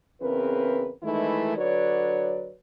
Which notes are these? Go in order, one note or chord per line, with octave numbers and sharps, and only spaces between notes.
E2 C#3 C4 A#4 B4
D#3 E3 G#3 A3 D#4 E4
D3 F#3 B4 C#5 D5